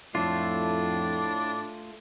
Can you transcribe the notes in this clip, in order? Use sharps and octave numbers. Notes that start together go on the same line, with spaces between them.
F2 A2 A3 D4 F4